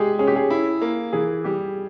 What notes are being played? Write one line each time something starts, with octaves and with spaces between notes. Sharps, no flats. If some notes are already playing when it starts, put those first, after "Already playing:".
Already playing: G#3 G4 G#4
C#4 G#4
G4
G#4
E4
A#3
E3 G#4
G3 G4